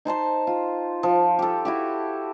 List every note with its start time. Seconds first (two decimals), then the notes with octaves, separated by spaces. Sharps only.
0.05 D#4 C5 A5 C6
0.47 F4
1.03 F3
1.39 G4 A4
1.65 E4 F#4 G4